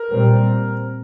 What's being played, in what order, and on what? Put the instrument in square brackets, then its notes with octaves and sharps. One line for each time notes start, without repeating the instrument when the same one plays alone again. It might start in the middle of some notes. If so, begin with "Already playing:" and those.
Already playing: [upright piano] A#4
[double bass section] A#2 G3 C4